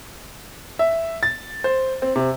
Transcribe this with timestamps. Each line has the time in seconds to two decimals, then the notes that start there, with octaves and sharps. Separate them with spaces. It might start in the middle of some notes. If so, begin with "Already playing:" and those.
0.79 E5
1.23 A6
1.64 C5
2.02 C4
2.16 C3